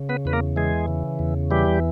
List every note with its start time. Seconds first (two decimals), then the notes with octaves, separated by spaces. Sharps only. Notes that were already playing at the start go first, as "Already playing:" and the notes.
Already playing: C#3
0.09 B3 B4
0.25 E2 B4
0.33 A#3 A#4
0.56 E3 G#3 G#4
0.88 C#3
1.19 E2
1.51 E3 G3 G4